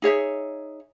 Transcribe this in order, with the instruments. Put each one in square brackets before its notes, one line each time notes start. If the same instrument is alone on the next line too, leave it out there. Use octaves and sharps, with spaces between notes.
[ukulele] D#4 G#4 C#5 E5